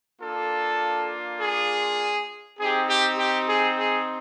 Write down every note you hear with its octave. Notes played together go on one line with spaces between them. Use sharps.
A#3 D4 F4 A4
G#4
C4 D#4 G4 G#4
G4
G4
G#4
G#4